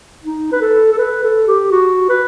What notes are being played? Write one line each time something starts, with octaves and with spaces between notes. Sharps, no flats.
D#4
B4
A4
A4
B4
A4
G4
F#4
B4